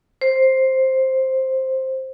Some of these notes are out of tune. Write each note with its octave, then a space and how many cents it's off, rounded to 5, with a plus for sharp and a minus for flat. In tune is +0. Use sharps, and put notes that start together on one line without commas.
C5 +5